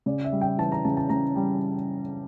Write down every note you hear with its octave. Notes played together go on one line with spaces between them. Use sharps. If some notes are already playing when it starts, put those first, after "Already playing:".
C#3 D5
E5
G3
G5
E3 A5
A#5
C#3 A5
A5
C#3 A#5
G3